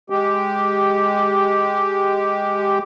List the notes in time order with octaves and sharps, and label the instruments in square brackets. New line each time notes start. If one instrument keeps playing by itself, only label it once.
[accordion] G#3 G4